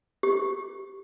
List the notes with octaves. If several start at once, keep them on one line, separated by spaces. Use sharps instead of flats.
G4